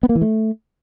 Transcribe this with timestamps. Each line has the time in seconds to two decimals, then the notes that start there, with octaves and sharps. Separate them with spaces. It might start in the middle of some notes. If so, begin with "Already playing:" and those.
0.03 B3
0.09 A#3
0.15 E3
0.22 A3